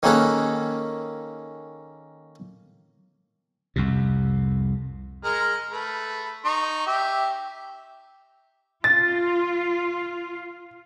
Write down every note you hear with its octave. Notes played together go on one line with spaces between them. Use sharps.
D#3 A#3 C#4 G#4 A4 B4
C2 F2 C3
G#3 A#4 F6
A3 B4
D#4 C#6
G4 E5
F4 A6